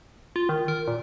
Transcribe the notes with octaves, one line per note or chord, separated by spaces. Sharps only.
F4
D#3
A#4
A#2